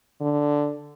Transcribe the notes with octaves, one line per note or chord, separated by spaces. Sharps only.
D3